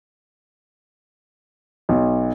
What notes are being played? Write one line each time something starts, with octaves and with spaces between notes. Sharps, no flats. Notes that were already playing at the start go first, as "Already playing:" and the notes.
B1